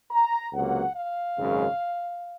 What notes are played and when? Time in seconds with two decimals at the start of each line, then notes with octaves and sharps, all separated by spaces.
0.10 A#5
0.53 C#2 C3 F#3 A#3 F#5
0.95 F5
1.37 G#1 F#2 C#3 G#3